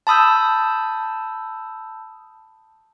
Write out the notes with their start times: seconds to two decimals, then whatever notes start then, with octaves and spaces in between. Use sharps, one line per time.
0.07 A5 B5 D#6 E6 G6